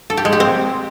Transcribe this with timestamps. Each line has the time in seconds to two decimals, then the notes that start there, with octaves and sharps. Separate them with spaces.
0.10 A4
0.17 G4
0.25 G#3
0.33 G4
0.40 C4